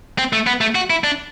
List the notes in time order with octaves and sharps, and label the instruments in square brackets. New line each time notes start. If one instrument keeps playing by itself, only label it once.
[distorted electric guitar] C4
A3
B3
A3
F#4
E4
D4